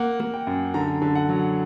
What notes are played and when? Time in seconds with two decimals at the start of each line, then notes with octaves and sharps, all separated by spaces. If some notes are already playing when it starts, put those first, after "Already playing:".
Already playing: A#3 F#5
0.20 A#3
0.34 G5
0.47 F#2
0.74 D3 A#5
1.02 D3
1.15 F#5
1.29 F#3